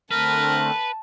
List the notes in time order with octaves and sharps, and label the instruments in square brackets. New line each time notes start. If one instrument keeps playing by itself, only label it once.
[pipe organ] D3 A3 C4 [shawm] A#4 [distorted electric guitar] B4 [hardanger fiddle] A5